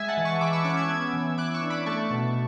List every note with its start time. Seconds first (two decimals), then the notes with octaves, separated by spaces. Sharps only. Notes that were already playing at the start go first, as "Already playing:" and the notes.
Already playing: G#3 E5 G#5
0.08 F#5 A5
0.17 E3
0.25 A5 C#6
0.41 E3 B5 D6
0.53 C#6 E6
0.65 C#4 D6 F#6
0.77 E6 G#6
0.90 B3 E6 G#6
1.14 E3
1.38 E3 D6 F#6
1.54 C#6 E6
1.63 D4
1.70 B5 D6
1.86 A3 A5 C#6
2.11 B2